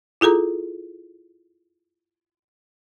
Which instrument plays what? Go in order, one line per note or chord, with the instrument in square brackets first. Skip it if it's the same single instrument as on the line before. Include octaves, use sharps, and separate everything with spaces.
[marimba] E4 F4 G#4 A4 A#5